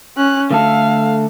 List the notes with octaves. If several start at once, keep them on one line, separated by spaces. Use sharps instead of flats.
C#4 F#6
D3 A3 A4 F5